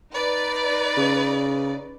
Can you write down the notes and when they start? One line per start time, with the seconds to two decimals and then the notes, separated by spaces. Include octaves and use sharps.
0.10 D#4 B4 D5
0.97 C#3